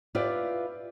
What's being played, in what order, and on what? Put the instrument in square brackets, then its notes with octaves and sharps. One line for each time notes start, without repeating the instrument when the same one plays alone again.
[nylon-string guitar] E4 F4 G4 B4 D5